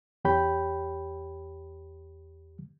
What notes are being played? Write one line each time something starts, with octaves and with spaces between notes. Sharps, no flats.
E2 G4 C#5 G5 B5 G6